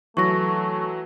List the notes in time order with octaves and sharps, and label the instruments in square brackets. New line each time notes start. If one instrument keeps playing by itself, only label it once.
[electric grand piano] E3 F#3 [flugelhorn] A3 [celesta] C#6 A#6